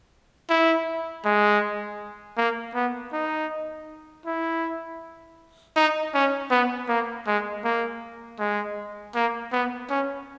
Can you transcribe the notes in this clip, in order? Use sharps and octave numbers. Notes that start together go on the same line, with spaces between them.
E4
G#3
A#3
B3
D#4
E4
D#4
C#4
B3
A#3
G#3
A#3
G#3
A#3
B3
C#4